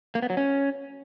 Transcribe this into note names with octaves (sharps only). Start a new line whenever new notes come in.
A#3
B3
F#3
C#4